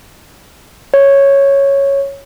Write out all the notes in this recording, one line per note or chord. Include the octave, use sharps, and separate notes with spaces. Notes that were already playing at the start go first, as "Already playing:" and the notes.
C#5